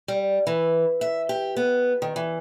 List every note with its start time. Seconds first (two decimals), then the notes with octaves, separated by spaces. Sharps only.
0.08 G3
0.47 E3
1.01 E5
1.29 G4
1.56 B3
2.02 D#3
2.16 E3